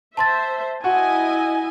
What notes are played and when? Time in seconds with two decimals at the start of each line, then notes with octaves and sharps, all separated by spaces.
0.17 C5 E5 A5 C6 A6
0.84 E4 F#4 D#5 G#5